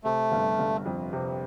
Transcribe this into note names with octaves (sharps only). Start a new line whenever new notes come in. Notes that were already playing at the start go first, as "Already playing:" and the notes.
C3 A3
G1
G1
F2
C3